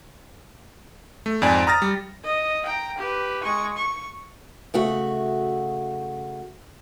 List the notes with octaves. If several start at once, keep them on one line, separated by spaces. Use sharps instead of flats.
A3
F2 G#2 D5 G#5
A#5 D#6 F6 A6 A#6
G3
D#5
G5 A#5
G4 B4
G#3 C#6
C#6
C#3 A3 F#4